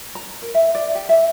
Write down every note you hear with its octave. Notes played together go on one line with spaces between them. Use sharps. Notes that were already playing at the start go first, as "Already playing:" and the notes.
A#5
A#4
E5
D5
G4
E5